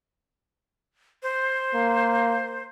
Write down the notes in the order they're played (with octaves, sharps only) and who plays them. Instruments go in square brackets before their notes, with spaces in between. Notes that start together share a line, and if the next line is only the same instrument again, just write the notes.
[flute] C5
[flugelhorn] A#3